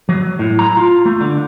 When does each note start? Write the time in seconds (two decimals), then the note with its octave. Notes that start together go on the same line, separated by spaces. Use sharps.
0.09 F#3
0.39 A2
0.59 A#5
0.77 F4
1.05 A3
1.21 D3